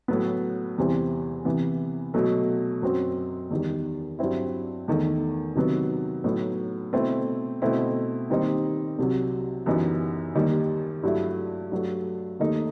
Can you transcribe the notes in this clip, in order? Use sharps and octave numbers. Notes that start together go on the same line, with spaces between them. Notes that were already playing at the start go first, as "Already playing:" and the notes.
A2 F#3 B3
E2 C3 E3 G3 C4
C3 E3 B3
B2 F#3 A3
F#2 F#3 C4
E2 D#3 G3
G2 F#3 C4 E4
E2 D#3 A3
C3 D#3 F#3 B3
A2 F#3 B3 D#4
B2 A3 C4 E4
B2 A3 C4 E4
D#2 D#3 G3 C4 D#4
C2 C3 F#3
F#2 E3 G3 B3 D#4
D#2 D#3 G3 D#4
G2 F#3 A3 E4
G2 F#3 A3
D#2 D#3 A3 D#4